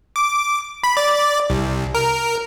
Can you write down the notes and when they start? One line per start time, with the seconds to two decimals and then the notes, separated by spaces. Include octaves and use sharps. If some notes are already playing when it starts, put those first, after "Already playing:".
0.16 D6
0.83 B5
0.97 D5
1.50 C2
1.95 A#4